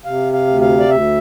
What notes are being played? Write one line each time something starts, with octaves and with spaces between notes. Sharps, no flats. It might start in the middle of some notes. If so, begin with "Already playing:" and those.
C3 F5
F5
D2
F5
D5
D2 E5